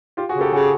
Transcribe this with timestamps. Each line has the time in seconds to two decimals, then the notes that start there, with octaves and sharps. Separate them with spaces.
0.17 F4 G4
0.29 F#4 G#4
0.35 C#3
0.41 G4 A4
0.53 C#3 F#4 G#4